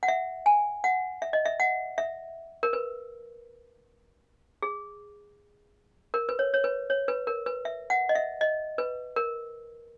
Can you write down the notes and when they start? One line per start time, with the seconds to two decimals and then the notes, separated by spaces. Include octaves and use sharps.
0.03 F#5
0.08 E5
0.46 G#5
0.84 F#5
1.22 E5
1.33 D#5
1.46 E5
1.60 F#5
1.98 E5
2.63 A#4
2.73 B4
4.62 G#4
6.14 A#4
6.29 B4
6.39 C#5
6.54 C#5
6.64 B4
6.90 C#5
7.08 B4
7.27 A#4
7.46 B4
7.65 E5
7.90 F#5
8.09 D#5
8.15 E5
8.41 D#5
8.78 B4
9.16 A#4